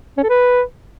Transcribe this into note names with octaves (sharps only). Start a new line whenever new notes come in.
C#4
A4
B4